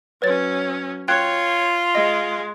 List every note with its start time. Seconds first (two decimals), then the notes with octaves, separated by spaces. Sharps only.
0.22 F#3 C#4 B4 C#5 A6
1.08 F4 C#5 G5 F#6 G#6
1.95 G#3 D#5